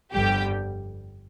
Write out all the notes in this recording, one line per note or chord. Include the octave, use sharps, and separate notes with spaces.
G1 F2 D3 G3 G4 G5